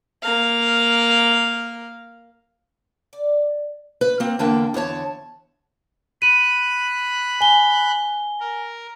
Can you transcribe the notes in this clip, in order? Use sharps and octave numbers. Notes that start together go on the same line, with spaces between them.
A#3 F5
D5
B4
A#3 C4
E2 D3 A#3 D4 G5
E2 D3 C#5 A5
B5 F#6 D#7
G#5 G7
A#4